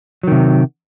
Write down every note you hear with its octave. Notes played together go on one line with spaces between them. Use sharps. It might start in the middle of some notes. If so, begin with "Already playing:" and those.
C3 D#3 F#3